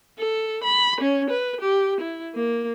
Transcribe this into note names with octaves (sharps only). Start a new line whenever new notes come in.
A4
B5
C#4
B4
G4
E4
A#3